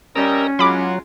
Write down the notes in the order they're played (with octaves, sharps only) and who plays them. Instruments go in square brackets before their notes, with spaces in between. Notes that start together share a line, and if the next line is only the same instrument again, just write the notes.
[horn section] G3 D#5 [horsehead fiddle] C#4 [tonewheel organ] A#4 A#5 E6
[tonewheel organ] F#3 [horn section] G#3 F4 F#4 [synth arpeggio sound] B5 D6